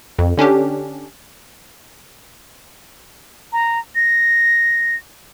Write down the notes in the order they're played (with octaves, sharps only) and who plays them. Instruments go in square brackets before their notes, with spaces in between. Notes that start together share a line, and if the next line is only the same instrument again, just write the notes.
[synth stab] F2
D3 C#4 D4 G4
[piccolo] A#5
A#6